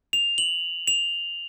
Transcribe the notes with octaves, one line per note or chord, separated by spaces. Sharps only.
F7
F#7
F7